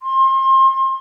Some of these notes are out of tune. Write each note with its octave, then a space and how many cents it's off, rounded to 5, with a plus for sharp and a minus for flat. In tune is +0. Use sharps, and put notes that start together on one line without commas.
C6 +30